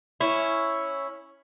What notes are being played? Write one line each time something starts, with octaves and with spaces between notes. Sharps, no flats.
C#4 E4